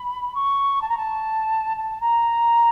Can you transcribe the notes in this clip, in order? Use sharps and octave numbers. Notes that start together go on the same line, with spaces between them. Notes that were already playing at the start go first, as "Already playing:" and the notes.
Already playing: B5
C#6
A5
A#5
A5
A5
A#5